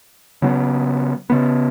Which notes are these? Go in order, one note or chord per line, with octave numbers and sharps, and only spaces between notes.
C#3 F#3 B3
C#3 B3